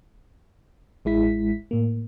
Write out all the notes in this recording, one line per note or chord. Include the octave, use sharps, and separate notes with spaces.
A1 G#3 E4 B6
A2 A#3